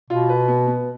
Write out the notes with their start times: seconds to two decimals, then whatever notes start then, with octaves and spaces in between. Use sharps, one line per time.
0.10 B2 F4
0.29 B4
0.48 B3
0.67 B3